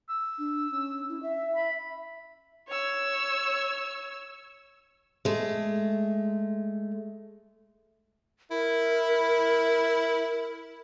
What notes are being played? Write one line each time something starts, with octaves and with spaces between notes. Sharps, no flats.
E6
D4
C#4
E4
E5
B5
C#5 E6
G#3 A3
E4 A#4